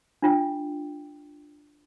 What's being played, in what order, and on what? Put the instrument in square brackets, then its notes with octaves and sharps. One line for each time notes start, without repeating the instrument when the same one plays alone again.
[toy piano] D4 F4 G5